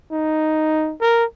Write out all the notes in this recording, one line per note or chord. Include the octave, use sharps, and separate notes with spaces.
D#4
A#4